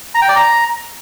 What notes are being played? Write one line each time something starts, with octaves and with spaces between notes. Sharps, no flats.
A#5
G5
D5
A#5